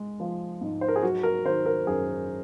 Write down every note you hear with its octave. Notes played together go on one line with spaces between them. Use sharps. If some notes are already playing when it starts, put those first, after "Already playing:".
Already playing: G#3
F3
G#2
C5
A#4
G#4
F#3 F#4
A#4
D#3 C5
A#4
F#2 G#4